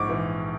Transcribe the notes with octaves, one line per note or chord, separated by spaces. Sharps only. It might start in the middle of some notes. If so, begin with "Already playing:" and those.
Already playing: A#1 G#2 C#6 D6
E3